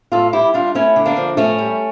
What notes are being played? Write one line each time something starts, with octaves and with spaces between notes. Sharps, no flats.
A2 F4 A4
G3 E4 G4
G3 D4 F4
A3 C#4 E4
D3
A#3 D4
F3
A2 A3 C#4
G3